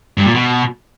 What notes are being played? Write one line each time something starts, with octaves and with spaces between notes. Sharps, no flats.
G2
A#2
B2